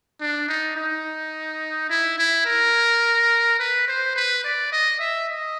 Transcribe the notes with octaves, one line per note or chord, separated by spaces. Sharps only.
D4
D#4
D#4
E4
E4
A#4
B4
C5
B4
D5
D#5
E5
D#5